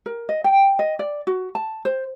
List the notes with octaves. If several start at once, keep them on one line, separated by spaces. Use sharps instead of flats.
A#4
D#5
G5
D#5
D5
F#4
A5
C5